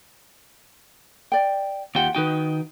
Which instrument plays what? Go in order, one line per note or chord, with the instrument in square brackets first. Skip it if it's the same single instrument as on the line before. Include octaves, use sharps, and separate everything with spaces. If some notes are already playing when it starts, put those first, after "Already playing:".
[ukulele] D5 G5
[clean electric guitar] D#2 G5 [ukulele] F4 G4 F#5
[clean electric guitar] D#3 D#4 G5 [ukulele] F#4 B4